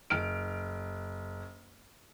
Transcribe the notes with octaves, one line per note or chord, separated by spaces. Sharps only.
F#1 F6 D7